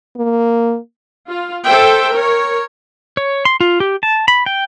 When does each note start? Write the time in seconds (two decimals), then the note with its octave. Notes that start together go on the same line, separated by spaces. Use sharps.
0.16 A#3
1.28 F4
1.64 A4 C5 E5 G5
2.11 A#4 C#5
3.17 C#5
3.45 C6
3.60 F4
3.80 G4
4.03 A5
4.28 B5
4.46 G5